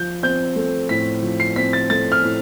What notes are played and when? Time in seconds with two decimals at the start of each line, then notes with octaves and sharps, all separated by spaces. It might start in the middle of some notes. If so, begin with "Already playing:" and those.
Already playing: F3 G6
0.23 C4 G6
0.56 A3
0.89 A2 B6
1.23 F3
1.40 C7
1.56 C4 B6
1.73 A6
1.90 A3 A6
2.12 F6
2.23 A2